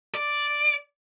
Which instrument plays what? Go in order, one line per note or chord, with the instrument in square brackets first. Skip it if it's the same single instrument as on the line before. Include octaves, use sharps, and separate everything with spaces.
[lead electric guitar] D5